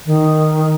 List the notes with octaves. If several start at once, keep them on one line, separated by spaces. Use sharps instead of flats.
D#3